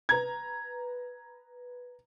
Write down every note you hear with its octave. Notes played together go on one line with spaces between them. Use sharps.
B4 A#5 G#6